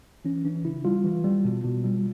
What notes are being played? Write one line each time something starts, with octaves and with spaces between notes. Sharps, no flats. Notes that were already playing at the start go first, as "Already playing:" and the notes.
E3 C#4
E3 D4
C#3 E4
G3 F4
E3
G3
B2
B2
G3